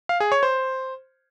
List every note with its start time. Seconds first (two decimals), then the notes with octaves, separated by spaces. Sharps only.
0.09 F5
0.20 G#4
0.32 C#5
0.43 C5